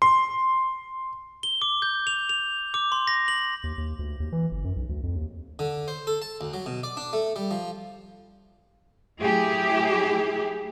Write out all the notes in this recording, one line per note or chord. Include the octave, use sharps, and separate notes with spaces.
C6
G7
D6
G6
F7
F7
D6
C6
A#6
F#7
D#2
D#2
D2
D#2
E3
G1
F#2
B1
D2
F2
D#2
D3
C5
A4
A5
D2
F#3
B2
D5
D4
A3
G3
F3
F#3 A3 E4 G4 G#4